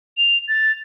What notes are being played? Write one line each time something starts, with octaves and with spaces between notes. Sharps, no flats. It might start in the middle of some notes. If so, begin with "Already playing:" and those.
F7
A6